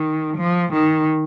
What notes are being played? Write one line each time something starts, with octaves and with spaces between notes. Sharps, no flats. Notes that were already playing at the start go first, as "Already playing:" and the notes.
Already playing: D#3
F3
D#3